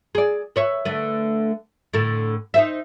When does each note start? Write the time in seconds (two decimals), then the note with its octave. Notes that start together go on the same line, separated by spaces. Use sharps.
0.15 G#4 D5
0.56 B4 C#5 E5
0.85 D3 A3 B4
1.93 A2 D3 A4
2.54 D#4 C5 E5